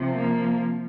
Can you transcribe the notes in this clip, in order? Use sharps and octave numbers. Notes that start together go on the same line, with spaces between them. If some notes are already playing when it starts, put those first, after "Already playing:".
Already playing: C3 F3
A#3